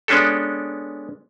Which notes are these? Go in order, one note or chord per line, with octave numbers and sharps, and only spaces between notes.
G#3 B3 C#4 D4 G4 A4